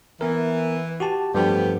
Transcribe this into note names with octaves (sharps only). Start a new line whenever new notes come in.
E3 B3 A#4
F#4 G4 A5
G2 F3 A3 B3 G4